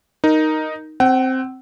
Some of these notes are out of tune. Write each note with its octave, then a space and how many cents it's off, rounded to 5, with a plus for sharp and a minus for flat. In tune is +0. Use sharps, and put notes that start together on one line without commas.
D#4 +0 A#4 +0
C4 +0 F#5 +40